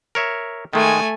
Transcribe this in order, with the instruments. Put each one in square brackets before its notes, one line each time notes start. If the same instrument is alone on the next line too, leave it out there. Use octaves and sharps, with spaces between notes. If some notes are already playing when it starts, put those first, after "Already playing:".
[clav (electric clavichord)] A#4 C#5 E5
[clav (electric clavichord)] D#3 G#3 [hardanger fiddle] A3 G#5